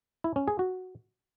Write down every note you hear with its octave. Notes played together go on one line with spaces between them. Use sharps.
E4
C#4
G#4
F#4